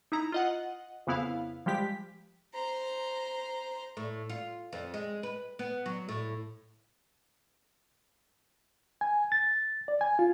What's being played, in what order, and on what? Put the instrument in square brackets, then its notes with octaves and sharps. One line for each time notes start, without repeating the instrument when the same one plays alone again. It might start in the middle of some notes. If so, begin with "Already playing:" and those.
[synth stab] D#4 E4 A#5
F4 D#5 F#5
F2 C#3 B3 E4 F5
F3 G3 G#3 G4 B6
[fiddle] C5 A#5
[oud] A2
F4
F2
G#3
B4
B3
F#3
A2
[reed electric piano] G#5
A6
D5
G#5
F4